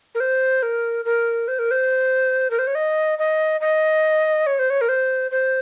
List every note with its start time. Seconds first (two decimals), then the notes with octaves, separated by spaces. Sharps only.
0.15 A#4
0.20 C5
0.63 A#4
1.05 A#4
1.48 C5
1.59 A#4
1.71 C5
2.51 A#4
2.59 C5
2.67 C#5
2.75 D#5
3.19 D#5
3.61 D#5
4.47 C#5
4.59 C5
4.70 C#5
4.81 A#4
4.89 C5
5.31 C5